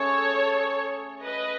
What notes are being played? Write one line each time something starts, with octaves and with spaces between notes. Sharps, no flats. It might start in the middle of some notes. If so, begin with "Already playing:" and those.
Already playing: A3 C#4 G#4 A4 C#5
B4 D#5